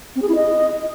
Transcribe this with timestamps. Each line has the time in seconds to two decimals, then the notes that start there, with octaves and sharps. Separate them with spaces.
0.16 C4
0.22 G#4
0.29 E4
0.35 D#5